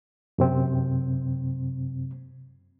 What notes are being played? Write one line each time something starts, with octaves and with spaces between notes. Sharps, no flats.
F#2 C3 C4